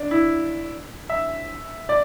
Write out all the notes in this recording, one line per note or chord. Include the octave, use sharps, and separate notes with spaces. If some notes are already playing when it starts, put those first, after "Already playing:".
Already playing: D4
E4
E5
D5